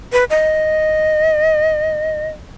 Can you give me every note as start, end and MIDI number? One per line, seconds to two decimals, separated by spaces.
0.13 0.24 71
0.30 2.28 75